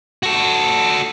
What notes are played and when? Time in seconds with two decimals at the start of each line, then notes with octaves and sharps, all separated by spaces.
0.23 F#4 A4